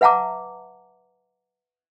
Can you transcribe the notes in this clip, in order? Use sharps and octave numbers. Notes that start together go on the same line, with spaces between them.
B4 E5 F#5 A5 A#5 D6